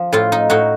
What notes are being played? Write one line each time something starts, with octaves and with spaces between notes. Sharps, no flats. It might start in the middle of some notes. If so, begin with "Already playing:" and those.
Already playing: F3
A2 F4
D#4
A2 D#4 F#4